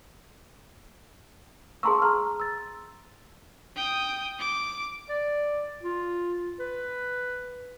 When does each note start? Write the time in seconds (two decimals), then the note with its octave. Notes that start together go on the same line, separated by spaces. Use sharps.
1.83 G#4 A5 A#5 C6 C#6 E6
2.02 A#5 C6 F6
2.40 E6 A6
3.76 G5 D#6
4.39 D6
5.09 D5
5.83 F4
6.59 B4